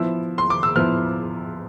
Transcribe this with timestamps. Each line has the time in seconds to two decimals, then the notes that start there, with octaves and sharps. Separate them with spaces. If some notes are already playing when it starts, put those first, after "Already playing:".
Already playing: F3 B3 E4 E6
0.38 C6
0.50 D6
0.63 E6
0.76 F3 B3 E4 F6